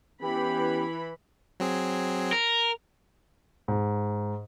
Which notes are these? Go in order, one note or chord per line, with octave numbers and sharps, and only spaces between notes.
E3 B3 C#4 G4 B5
F#3 C4 G#4
A#4
G#2